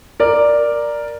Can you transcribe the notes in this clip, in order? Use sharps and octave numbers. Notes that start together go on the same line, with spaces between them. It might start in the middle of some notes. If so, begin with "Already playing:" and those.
A#4 D5